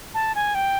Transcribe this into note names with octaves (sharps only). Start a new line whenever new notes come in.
A5
G#5
G5